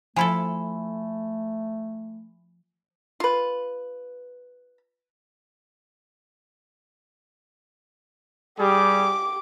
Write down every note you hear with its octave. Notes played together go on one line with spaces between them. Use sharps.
F3 A3 E4 A4 G#5 B5
F4 B4
G3 G4 G#4 D6